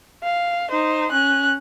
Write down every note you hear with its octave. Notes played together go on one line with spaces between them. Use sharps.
F5
D#4 C5
C#4 F#6